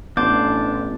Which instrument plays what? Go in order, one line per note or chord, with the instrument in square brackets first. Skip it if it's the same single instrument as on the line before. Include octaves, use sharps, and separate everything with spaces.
[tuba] A1 [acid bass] B3 [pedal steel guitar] D4 C5 [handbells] D6 G6